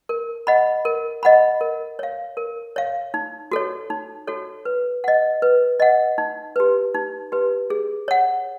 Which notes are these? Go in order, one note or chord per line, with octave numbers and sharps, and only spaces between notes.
A#4
D#5 F#5 B5
A#4
D#5 F#5 B5
A#4
C#5 F5
A#4
C#5 F5
D#4
F#4 A4 C#5
D#4
F#4 A4 C#5
B4
D#5 F#5
B4
D#5 F#5
D#4
G4 B4
D#4
G4 B4
G#4
C#5 F#5